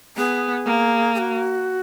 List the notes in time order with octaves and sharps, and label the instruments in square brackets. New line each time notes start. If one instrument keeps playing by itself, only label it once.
[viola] B3 [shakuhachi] G#4
[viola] A#3
[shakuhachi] G#4
F#4